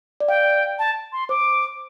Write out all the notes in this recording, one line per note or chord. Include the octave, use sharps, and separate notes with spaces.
D5
F5 G5
A5
C6
C5 D6